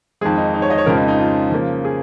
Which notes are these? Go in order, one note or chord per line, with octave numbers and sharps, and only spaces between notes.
F2 D#3 G#3 G#4
D#4
D#4
C#5
D#5
C#5
F2 C#3 F3 G#3 A#4
D#4
D#4
F4
C#3 F3 A#3
G#4